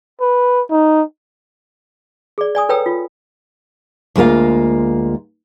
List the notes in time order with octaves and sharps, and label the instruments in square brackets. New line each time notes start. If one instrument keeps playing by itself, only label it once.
[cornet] B4
D#4
[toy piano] G#4 D5
D5 G#5 D#6
A4 B4 C#5 G5 A#5 E6
F4
[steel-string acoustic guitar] D2 G#3 A#3 F4 F5